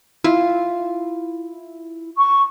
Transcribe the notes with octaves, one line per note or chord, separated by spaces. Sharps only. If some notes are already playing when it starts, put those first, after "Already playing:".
E4 F4
C#6